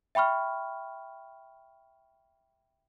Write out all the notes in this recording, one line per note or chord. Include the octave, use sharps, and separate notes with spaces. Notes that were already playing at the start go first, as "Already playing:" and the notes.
E5 G5 B5 C#6 F6